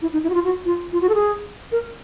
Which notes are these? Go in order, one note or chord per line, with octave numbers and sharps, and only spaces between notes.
E4
D#4
E4
F#4
F4
F#4
F4
F4
F#4
A4
G#4
A#4